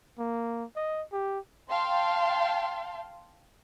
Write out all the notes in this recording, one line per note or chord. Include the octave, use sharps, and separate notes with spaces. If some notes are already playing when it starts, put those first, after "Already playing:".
A#3
D#5
G4
F5 G5 A5 C6